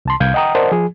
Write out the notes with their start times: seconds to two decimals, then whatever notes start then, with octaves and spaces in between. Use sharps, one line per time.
0.05 C2 A5 C6
0.20 C2 F5 G6 G#6
0.34 D#5 F#5 G5 A#5 D#6
0.55 A#4 C5 D5 D#5 F#5 A5
0.72 F3 G#4